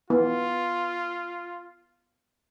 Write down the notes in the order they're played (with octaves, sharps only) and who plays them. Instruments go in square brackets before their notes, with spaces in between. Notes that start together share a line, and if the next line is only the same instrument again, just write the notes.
[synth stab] E3 [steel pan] B3 [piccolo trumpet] F4